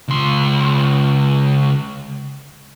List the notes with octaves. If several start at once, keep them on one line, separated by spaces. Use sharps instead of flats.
C#2 C6